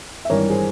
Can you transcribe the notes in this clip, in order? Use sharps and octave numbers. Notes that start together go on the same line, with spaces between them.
E5
G#1 G2 E3 G3 A#4 C#5
G#4 C5